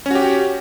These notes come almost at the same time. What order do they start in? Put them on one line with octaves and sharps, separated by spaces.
C#4 F#4 G4